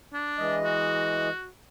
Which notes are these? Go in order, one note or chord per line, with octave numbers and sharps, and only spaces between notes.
D4
E3 G#3 D#5
F#4